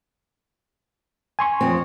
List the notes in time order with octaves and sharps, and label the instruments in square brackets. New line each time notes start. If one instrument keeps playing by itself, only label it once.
[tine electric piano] G#5 C6 C#6
[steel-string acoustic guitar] F2 C4